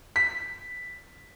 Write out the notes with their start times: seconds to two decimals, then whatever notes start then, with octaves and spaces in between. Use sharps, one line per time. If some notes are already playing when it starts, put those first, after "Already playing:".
0.16 B6